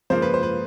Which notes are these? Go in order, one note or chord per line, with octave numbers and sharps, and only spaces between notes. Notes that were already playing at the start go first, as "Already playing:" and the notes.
C#3 F3 A#3 C5
B4
C5
B4